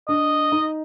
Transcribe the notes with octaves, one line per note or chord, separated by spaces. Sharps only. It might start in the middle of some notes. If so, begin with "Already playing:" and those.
D4 D#5
D#4